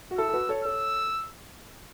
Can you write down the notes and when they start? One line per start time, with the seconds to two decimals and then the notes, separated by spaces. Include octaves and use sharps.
0.11 F#4
0.18 E4 A4 E6
0.29 A4
0.34 F#4 B4
0.49 A4 C#5
0.65 A4 C#5 E6